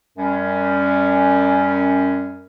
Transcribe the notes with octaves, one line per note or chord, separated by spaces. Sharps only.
F#2 G3 C#4